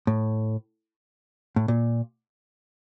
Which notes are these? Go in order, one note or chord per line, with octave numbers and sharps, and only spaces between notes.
A2
A2
A#2